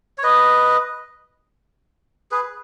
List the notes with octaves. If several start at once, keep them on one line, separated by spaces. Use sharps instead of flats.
C#5
B4 D#5
G#4 B4